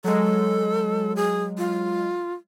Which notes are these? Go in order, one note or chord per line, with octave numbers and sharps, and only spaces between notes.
F#3 G#3 A4
G#4
F4